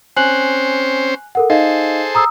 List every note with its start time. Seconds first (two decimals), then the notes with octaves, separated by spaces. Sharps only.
0.16 C4 C#4 C5 G#5 F#6 F#7
1.35 A4 A#4 F#5
1.50 D#4 G#4 A4 C5 D#5 F5
2.15 A#5 D#6 E6